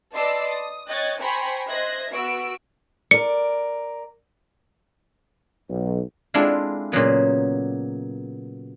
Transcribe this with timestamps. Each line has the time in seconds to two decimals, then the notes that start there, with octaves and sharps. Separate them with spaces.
0.15 B4 D5 D#5 A5 C6 E6
0.49 D#6
0.89 C#5 D#5 G5 F#6 G#6 A6
1.21 C5 G5 G#5 A#5 B5 C#6
1.69 C5 D#5 E5 F#6 G#6 A#6
2.12 B3 F#4 E6 D7
3.11 A#4 D5 C#7
5.69 B1
6.34 G#3 C4 D4 E4 F4 A4
6.92 A#2 C#3 F#3 B3